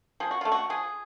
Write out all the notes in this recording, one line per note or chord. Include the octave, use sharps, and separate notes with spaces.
F3 G#4
F#4
A3 F4
F#4
F3 G#4